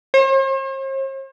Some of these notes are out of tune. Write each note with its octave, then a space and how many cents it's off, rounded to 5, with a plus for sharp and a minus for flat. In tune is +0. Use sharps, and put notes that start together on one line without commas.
C5 +45